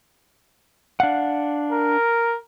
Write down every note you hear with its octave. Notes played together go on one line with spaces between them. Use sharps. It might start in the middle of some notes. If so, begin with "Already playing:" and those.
D4 F5 F#5
A#4